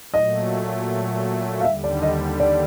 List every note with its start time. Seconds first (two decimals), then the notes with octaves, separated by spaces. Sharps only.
0.14 A#2 F#3 A3 D#5
1.60 F5
1.64 D#2 D3 G3 E5
1.84 D5
2.02 D#5
2.40 D5